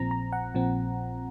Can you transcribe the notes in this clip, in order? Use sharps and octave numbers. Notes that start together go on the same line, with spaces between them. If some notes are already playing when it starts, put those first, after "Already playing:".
Already playing: A#1 A#2 F3 C4 A#5
A#5
F#5
A#1 A#2 F3 C4